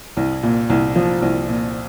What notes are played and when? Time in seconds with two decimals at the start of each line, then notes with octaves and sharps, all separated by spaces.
0.17 C2
0.43 A#2
0.70 C2
0.96 F3
1.22 C2
1.48 A#2